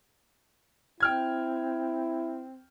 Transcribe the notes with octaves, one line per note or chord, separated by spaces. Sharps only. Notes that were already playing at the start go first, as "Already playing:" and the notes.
C4 E4 G5 F6 G#6